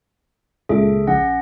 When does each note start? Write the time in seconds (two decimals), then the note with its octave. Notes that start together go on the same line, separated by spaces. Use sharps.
0.69 C#2 A#2 G#4 A4 E5
1.07 A#1 C#4 F#5 A#6